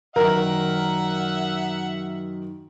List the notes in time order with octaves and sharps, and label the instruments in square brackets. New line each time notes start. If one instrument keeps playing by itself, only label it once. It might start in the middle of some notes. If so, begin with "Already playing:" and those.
[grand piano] F#2 D#3 [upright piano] A#4 [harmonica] E5 F#5